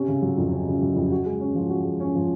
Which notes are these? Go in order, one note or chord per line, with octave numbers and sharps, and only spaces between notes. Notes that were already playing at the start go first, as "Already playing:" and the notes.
Already playing: C3 C#4
C#3
F#3
F2
C#4
C#3
F#3
F2
F#4
G#3
C#4
F3
F#4
G#3
C#4
F3